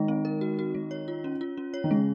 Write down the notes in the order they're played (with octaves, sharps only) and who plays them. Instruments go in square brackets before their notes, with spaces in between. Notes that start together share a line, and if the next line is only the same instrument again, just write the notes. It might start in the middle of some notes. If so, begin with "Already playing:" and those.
Already playing: [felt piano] D#3 [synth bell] G#3
[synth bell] C4
A#4
F#4
F#4
G#3
C#5
F4
C#4
F4
C#4
C#5
[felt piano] D#3
[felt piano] C#3 [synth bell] G#3